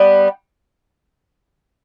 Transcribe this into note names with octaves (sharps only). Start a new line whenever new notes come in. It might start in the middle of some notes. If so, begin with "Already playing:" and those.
Already playing: G3 B3